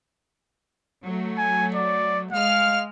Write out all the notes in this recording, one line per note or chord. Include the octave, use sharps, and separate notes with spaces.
F#3 A3
G#5
D5
G#3 F5 F6